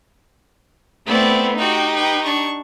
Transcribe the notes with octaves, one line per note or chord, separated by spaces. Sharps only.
A3 B3 C4 E4 D5
D#4 F#4 G4 G5
B4 G5
D4 C#6